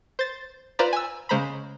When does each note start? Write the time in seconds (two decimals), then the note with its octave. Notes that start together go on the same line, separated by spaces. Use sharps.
0.19 C5 A6
0.79 F4 B4 C5 D5 A#5 B5
0.93 G#5 E6
1.29 C#3 G#3 C5 A#5 B5